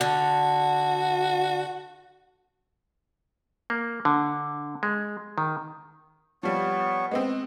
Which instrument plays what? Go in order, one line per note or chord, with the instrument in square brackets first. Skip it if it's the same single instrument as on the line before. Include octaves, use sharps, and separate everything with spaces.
[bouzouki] D3 [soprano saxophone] F#4
[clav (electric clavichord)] A#3
D3
G#3
D#3
[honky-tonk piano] F3 G3 [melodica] B3 C#5
[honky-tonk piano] G#3 B3 C4